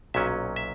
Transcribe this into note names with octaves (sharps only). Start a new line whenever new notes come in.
B1 A#2 F#3 C#4 E5
E5